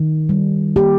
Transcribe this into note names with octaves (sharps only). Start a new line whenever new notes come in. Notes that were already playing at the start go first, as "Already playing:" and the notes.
Already playing: D#3
G3
A#3 G4